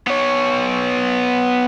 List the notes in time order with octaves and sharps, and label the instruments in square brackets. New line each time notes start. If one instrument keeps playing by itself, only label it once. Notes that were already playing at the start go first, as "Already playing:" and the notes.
[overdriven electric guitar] B3 C#5